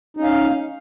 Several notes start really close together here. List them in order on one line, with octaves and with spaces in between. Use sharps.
D#4 C#4 F5